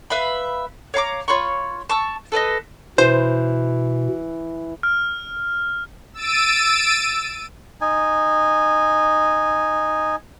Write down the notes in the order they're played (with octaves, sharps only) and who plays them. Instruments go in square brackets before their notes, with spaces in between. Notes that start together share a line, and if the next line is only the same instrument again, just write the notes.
[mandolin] B4 E5 F5 B5
C#5 F5 A#5 D6
F4 C#5 B5 C#6
A5 C#6 E6
A4 B4 D5 D#5
[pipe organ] B2 [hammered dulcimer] E3 [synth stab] C5
[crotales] F6
[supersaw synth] E6 A6 D7 D#7
[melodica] D#4 G#5